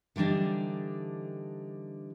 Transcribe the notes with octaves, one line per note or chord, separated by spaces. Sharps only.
D3 E3 G3 D4 D#4